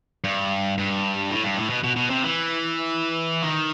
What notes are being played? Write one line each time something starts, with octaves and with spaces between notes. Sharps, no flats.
G2
G2
A2
G2
A2
B2
B2
B2
C3
E3
D#3